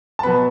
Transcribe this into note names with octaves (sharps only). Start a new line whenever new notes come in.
A5
B2 F#3 B3 B5